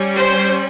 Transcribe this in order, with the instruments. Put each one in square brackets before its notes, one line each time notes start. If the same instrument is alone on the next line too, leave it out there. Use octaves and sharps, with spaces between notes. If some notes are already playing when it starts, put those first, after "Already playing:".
Already playing: [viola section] G3 C#4
C5